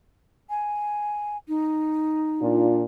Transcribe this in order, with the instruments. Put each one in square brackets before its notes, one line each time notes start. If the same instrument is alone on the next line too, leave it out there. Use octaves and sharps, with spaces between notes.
[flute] G#5
D#4
[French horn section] A#2 D4 F4